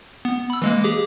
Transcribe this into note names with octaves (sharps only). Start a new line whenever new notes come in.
B3
B5 E6
E3 G#3 A#3
G4 G#4 D6